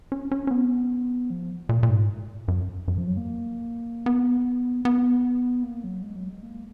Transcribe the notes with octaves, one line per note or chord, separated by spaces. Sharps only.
C#4
C#4
C#4
B3
F3
A#2
A#2
G#2
F#2
F#2
F3
F#3
A#3
B3
B3
A#3
F#3
G#3
F#3
G#3
A#3